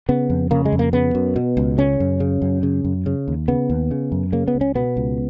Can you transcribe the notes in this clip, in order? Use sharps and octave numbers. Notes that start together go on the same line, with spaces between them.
C#3 B3
F2
C#3 A#3
G#3
F2
A#3
C#3 B3
F#2
B2
C#2
C#3 C#4
F#2
C#3
F#2
C#3
F#2
C#3
D#2
C#3 B3
D#2
C#3
F#2
C#3 A#3
B3
C#2
C#4
B2 B3
C#2